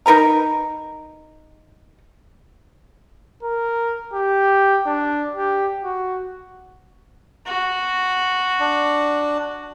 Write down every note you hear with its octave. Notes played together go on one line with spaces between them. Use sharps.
D#4 A#4 B4 A#5
A#4
G4
D4
G4
F#4
F#4
D4